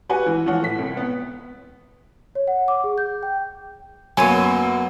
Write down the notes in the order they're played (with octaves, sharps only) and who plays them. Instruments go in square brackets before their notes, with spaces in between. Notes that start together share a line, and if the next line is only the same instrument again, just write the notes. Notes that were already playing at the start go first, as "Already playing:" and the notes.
[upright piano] F#4 G4 B4 F#5 G#5
E3
E3 F3 C#5 F#5
A2 B6
C2
B3
[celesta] C#5
F#5
D6
G#4
G6
G5
[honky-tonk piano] F#2 A#3 [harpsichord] F#3 [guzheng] B3 C#5 [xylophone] G#5 D#7